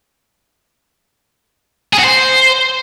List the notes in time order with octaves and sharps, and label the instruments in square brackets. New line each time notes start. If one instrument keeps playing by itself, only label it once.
[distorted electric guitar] G#4
F#4
C5